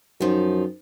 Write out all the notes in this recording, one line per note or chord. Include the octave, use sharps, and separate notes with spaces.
F#2 D#3 F3